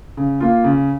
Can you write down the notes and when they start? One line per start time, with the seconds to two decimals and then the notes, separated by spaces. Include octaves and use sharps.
0.17 C#3
0.41 A#3 F4
0.64 C#3